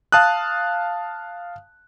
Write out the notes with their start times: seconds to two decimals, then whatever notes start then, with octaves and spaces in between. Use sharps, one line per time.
0.12 F5 A5 D#6 F#6